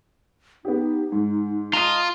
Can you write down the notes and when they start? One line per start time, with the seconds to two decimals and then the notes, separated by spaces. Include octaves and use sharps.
0.65 B3 D#4 G4
1.12 G#2
1.73 F4 D#5 A5 A#5